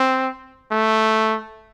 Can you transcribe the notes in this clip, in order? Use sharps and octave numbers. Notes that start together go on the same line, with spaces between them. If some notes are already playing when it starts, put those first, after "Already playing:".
Already playing: C4
A3